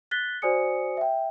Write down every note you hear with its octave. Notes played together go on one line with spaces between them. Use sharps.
F#6 A6 B6 G7
F#4 C5 D5 G#5 D#6 C#7
E5 G5